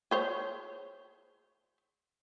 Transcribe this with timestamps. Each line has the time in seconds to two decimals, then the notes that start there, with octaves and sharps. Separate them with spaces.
0.11 G#4 C5 C#5